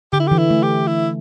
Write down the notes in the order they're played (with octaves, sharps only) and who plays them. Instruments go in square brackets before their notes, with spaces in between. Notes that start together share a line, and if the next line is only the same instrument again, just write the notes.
[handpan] D3 [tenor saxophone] G4
[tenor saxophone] E4
[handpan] E3 [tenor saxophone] G4
[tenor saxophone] E4
[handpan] A3
[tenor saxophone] G4
E4